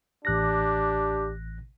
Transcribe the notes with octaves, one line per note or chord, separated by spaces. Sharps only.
A1 D4 G4 F#6 A#6